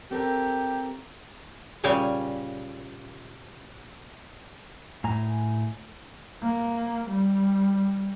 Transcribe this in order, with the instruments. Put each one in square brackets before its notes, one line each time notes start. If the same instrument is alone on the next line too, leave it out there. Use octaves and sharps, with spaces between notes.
[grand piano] C4 A4 A#4 [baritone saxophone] G4
[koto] A#2 C#3 G3 F5 G5 G#5
[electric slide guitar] A2 G#5 A#5
[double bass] A#3
G3